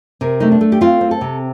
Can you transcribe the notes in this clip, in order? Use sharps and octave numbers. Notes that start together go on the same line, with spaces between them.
C3 A#4
A3 D#4
D4
A3
G4
C4 F4
C4
A4
C3